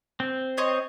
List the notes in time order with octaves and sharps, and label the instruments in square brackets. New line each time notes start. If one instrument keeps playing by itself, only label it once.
[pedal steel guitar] C4
[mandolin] C5 C#5 D#5